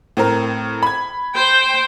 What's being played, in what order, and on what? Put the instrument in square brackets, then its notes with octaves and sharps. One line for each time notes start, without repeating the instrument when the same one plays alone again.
[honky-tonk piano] A2 C4 A#4
B5 G#6
[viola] C5 G5